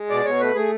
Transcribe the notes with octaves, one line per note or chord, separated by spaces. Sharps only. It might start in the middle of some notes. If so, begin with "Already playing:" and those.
Already playing: G#3
B2 D5
B2 C#5
A3 B4
A3 G#4